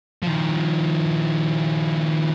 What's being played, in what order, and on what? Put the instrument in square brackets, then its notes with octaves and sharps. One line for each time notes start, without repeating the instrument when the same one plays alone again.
[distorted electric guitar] D#3 F3